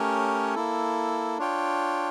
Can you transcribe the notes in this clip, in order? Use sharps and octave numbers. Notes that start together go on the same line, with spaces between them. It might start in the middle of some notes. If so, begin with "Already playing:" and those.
Already playing: A3 C#4 G4 A#4 C#5
A#3 E4 A4
D4 F4 C#5 G5